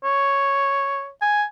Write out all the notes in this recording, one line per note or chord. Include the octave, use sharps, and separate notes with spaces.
C#5
G#5